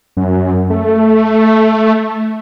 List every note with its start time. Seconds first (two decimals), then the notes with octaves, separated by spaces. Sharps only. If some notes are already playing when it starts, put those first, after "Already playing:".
0.17 F#2
0.70 A3